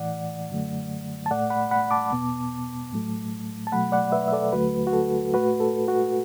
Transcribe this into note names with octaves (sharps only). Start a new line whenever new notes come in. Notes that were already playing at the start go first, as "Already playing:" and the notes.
Already playing: A2 E3 A3 D5 F#5
F#2 D3 F#3 A3
A5
A2 A3 D5 F#5
F#5 B5
F#5 B5
A5 D6
E2 B2 B3
A2 F#3 A3
A5
B2 F#3 A3 F#5 B5
D5 F#5
B4 E5
E5
A4 D5
D2 D3 F#3 A3 F#4 B4
F#4
A4
A2 A3 F#4 B4
A4
F#4